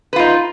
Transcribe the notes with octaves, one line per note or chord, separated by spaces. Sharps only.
D#4 F4 B4